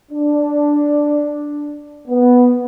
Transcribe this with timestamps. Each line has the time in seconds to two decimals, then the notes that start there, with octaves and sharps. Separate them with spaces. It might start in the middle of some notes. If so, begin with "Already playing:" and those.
0.11 D4
2.08 B3